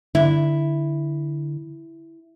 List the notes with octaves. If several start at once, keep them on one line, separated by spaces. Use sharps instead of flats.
D3 E4